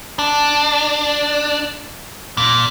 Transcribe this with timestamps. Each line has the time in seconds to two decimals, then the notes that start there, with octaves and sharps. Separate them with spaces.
0.19 D4
2.37 A#2